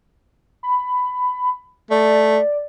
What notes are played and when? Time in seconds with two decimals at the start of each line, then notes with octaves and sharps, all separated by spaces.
0.63 B5
1.91 A3 D5